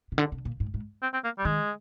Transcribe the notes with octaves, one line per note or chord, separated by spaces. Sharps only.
C3
D3
C3
A#2
G#2
G#2
C4
C4
A#3
G3
D#3 G#3